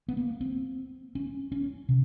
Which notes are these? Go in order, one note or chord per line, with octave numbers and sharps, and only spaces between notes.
B3
A#3
C4
C#4
C#4
C3